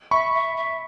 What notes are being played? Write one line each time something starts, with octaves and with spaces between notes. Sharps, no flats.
E5 B5 C#6
E5
E5